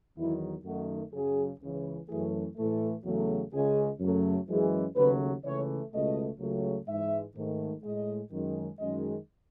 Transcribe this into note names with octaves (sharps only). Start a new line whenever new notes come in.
E2 D#3 F#3 E4
F#2 D#3 A3 F#4
F#2 C#3 F#3 G#4
C#2 C#3 E3
F#2 E3 A3 G#4
A2 E3 A3 A4
E2 C#3 F#3 A3
C#2 C#3 G#3 G#4
F#2 C#3 F#3 A3
F#2 E3 G#3 G#4
D#2 C#3 F#3 A3 B4
C#2 C#3 E3 A3 C#5
C#2 B2 A3 D#5
C#2 C#3 F#3 A3
G#2 E3 G#3 E5
G#2 D#3 A3
A2 G#3 D#5
F#2 D#3 G#3
F#2 D#3 G#3 D#5